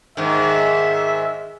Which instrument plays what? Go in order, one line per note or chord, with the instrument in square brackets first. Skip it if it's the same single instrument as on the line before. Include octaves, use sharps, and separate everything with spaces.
[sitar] G#2 D#3 [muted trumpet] E5